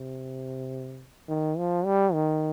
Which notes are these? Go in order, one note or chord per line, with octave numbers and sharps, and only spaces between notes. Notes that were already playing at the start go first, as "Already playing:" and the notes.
Already playing: C3
D#3
F3
G3
D#3